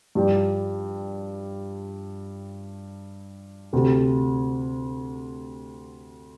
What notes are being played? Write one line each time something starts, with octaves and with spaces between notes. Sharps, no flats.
G2 F3 D4 G4
D2 C3 A3